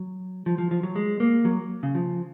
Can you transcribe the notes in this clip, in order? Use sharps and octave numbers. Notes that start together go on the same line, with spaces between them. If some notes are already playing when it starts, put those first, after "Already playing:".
Already playing: F#3
F3
F3
F3
F#3
G#3
A#3
F#3
C#3
F3